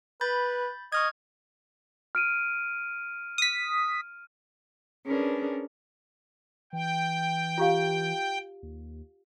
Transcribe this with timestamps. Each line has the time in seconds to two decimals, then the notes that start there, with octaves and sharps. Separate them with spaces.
0.21 B4 B5 G6 A6
0.92 D#5 C#6 F6 G#6
2.15 F6 D7 D#7
3.38 D#6 B6
5.05 C#4 D4 G#4 A#4 B4
6.73 E3 G5
7.58 F4 G4 F5
8.63 D#2